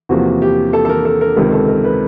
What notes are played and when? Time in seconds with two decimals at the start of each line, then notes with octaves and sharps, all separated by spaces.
0.09 E2 C3 F3 A#3 F#4
0.42 G4
0.73 A4
0.85 A4
0.89 A#4
1.05 A4
1.21 A#4
1.36 C#2 C3 D#3 A#4
1.52 A4
1.68 A#4
1.84 B4